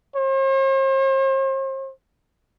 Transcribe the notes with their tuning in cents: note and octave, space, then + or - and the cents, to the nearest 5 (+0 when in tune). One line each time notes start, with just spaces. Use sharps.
C5 +45